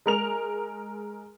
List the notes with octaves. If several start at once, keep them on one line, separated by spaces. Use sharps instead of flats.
G#3 A#4 F7